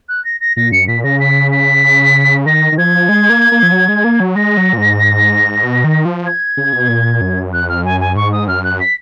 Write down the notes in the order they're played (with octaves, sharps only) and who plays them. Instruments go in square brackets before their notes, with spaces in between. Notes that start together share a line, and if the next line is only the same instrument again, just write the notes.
[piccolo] F#6
A#6
A#6
[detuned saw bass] A#2 [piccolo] A#6
[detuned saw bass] F#2 [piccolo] C#7
[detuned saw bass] A#2 [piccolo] B6
[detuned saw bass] C#3 [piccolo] A#6
[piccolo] B6
B6
[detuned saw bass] D#3 [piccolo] A#6
[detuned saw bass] D#3
[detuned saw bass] F3 [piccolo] G#6
[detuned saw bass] G#3
A#3
A#3
F3
F#3
G#3
A#3
F#3
[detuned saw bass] G#3 [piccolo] A#6
[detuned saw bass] F#3
A#2
G#2
B2
D#3
F3
[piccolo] G#6
[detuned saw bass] C#3
B2
A#2
F#2
[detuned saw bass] F2 [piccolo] F#6
[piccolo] F6
[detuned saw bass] F#2 [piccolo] G#5
[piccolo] G#5
[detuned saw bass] G#2 [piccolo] C#6
[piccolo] D#6
[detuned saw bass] F#2 [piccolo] F6
[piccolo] F#6
B6